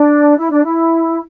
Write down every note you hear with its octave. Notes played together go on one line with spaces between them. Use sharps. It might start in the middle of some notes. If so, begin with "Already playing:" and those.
Already playing: D4
E4
D4
E4